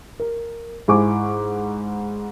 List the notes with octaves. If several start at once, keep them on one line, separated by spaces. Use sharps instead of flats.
A#4
G#2 E4 G#5 C#6 D6